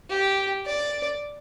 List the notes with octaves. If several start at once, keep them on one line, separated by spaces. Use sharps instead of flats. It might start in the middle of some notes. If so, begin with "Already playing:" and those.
G4
D5